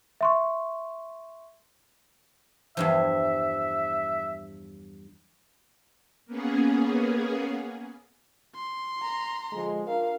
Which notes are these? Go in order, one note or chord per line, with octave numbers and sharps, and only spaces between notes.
E5 C6 C#6
E2 G2 F3 E5
A#3 B3 C#4 G#4
C6
A#5
D3 F3 G#3
D4 F4 A#4 F5